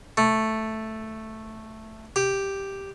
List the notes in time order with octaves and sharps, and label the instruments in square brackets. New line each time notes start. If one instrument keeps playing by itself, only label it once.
[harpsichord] A3
G4